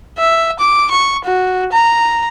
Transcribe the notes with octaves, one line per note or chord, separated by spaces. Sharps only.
E5
D6
C#6
F#4
A#5